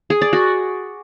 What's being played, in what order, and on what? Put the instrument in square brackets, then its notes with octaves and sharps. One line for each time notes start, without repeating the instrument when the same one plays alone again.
[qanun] G#4
D5
F#4